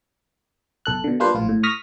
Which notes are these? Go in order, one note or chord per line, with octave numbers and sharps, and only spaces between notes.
B1 A4 F#6
B2 D3
G3 A#3 D4 F4 B4 C5
A#1 A2 F3 F4
A2
C#6 D#6 F6 A#6 B6